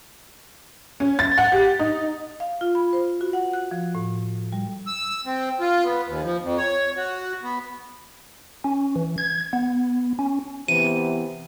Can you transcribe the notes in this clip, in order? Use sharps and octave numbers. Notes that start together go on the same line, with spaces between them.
C#4
A6
F#5
G4
D#4
F5
F4
B5
C5
F#4
F#5
F#6
F3
A2
G3
E6
C4
F4
B3
D#2
F3
F2
C#5
F#4
B3
C#4
E3
G#6
B3
C#4
C3 E3 B3 D#7